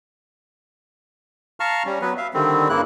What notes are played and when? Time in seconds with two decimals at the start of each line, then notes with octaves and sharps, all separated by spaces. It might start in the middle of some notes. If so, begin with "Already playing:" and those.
1.60 F5 A5 A#5 C#6 F6
1.86 G3 C#4
2.01 F#3 B3 B4
2.17 E5 F5
2.34 D3 D#3 G3 C4
2.69 G2 C#3 A#3 E4 F#6